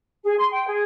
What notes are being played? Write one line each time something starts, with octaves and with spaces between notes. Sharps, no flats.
G#4
C6
G5
G#4